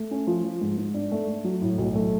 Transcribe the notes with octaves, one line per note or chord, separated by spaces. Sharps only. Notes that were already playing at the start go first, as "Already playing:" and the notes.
Already playing: A3
C#4
F3
F3
G#2
G#2
D4
A3
A3
F#3
A2
B1
A3